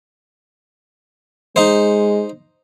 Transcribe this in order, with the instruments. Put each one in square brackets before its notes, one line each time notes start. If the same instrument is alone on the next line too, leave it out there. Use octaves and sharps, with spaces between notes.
[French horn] G#3 [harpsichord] D#4 C5